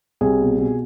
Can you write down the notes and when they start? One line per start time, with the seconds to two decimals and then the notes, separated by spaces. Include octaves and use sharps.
0.21 C2 G#4
0.40 B2
0.59 B2